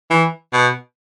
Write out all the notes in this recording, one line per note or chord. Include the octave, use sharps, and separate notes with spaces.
E3
B2